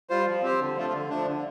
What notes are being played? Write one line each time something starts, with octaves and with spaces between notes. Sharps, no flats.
G3 F4 C5
F3
C4 G4 C5
D3
F3 A3 F4
D3
F3 A3 D4
D3